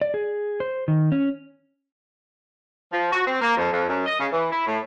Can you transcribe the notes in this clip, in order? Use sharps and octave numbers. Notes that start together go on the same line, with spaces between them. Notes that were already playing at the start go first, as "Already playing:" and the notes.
D5
G#4
C5
D#3
C#4
F3
F#4
C4
A#3
F2
F2
F#2
D#5
C#3
E3
E4
A2